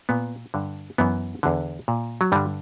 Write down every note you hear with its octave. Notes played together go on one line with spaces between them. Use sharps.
A#2 B3
G2 D3
F#2 E3 B3
E2 D3
A#2
F#3
G2 D3 G3